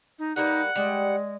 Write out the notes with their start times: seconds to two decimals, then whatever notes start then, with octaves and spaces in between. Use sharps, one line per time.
0.19 D#4
0.36 G3 A#3 D#4 B4 F#5 F#6
0.76 G3 G#3